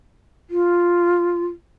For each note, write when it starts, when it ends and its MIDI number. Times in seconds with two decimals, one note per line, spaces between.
0.50 1.46 65